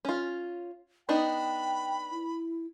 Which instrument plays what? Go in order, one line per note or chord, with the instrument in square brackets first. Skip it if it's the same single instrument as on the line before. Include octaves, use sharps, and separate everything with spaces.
[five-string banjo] C#4 F4
[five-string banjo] B3 D4 D#4 [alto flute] G5 [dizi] B5
[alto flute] E4